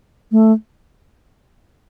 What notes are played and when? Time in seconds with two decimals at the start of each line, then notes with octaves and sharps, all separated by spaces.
0.32 A3